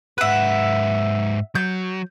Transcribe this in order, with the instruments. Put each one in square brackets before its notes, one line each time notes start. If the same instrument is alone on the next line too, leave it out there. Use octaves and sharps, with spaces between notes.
[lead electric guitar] G#2 B4 [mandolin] E5 F#5
[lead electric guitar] F#3 [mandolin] G6